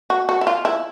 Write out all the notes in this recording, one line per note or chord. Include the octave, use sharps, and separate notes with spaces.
F#4
F#4
E4
F4
E4